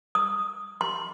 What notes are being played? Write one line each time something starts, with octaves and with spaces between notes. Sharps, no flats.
D#6
C6